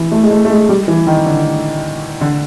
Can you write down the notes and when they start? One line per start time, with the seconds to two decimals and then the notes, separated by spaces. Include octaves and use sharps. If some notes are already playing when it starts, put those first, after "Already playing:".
Already playing: E3
0.12 A3
0.23 G#3
0.31 A3
0.45 A3
0.50 G#3
0.69 G3
0.88 E3
1.07 D#3
1.26 D3
2.21 D3